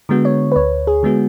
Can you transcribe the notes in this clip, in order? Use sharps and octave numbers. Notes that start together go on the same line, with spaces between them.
D3 G#3 B3 F#4
C#5
B4
D2 C#5
G#4
D3 G#3 B3 F#4